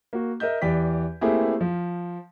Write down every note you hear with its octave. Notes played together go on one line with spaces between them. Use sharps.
A#3 F#4
A#4 D#5 E5 G6
E2 E3 G4 D5 B6
A3 A#3 C4 E4 G4 G#4
F3